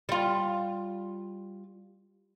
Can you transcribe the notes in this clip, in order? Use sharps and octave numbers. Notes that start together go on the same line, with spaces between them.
G3 F4